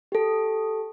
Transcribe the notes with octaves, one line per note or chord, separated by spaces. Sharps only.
G4 A4